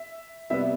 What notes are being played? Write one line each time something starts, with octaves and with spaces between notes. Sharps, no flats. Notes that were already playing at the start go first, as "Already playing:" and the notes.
Already playing: E5
C3 G3 B3 E5